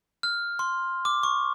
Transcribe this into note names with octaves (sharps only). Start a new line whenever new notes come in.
F6
C6
D6
C#6